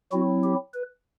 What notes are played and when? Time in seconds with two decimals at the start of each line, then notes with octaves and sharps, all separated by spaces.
0.12 F#3 C4 E4 F#4
0.43 G4
0.74 B4